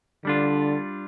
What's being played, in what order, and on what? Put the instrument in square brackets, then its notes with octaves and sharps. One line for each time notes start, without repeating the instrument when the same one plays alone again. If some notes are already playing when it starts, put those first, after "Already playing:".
[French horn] D3 [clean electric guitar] G3 D4 F4